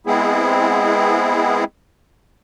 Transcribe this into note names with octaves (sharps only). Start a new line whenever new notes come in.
G#3 B3 C4 E4 G#4